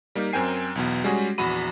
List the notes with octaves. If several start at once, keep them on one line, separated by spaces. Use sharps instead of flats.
G3 A#3 D#4
F#2 C4 A#4 G5 G#5 C7
B1 E2 B2
G3 G#3 C#4 F#4 G#4
A#1 E2 F#4 B5 D#7